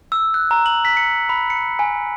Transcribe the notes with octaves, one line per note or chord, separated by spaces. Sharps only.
E6
F#6
A#5
F#7
B6
C#7
B5
C#7
G#5